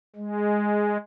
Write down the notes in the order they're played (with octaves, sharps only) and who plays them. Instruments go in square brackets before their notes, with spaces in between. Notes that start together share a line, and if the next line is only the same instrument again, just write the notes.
[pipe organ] G#3